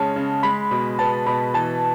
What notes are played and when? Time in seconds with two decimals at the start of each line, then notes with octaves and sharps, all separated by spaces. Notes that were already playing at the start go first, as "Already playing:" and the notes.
Already playing: C#3 G#3 C#4 A5
0.16 C#3
0.43 G#3 B5
0.71 B2
0.99 B3 A5
1.26 B2 B5
1.54 E3 A5